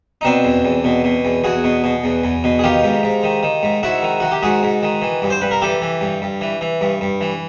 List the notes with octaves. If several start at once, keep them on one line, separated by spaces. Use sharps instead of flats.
D#4
B2 C4 D4
E2
E2
B2
B2
E2
E2 F#4 G#4
B2
B2
E2
E2
B2
G#4
D#3 F4 G4
G#2
G#2
D#3
D#3
G#2
G#2 E4 F#4
D#3
D#3 F#4
G4
G#2 F#4 G#4
G#2
D#3
E3
G2
C5
G2 B4
A#4
E3 G4 A4
E3
G2
G2
E3
E3
G2
G2
E3